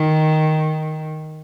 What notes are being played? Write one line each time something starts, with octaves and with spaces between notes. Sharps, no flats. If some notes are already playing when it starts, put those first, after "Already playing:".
Already playing: D#3